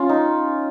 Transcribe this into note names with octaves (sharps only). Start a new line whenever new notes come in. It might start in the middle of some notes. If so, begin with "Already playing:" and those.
Already playing: C#4 F4
D#4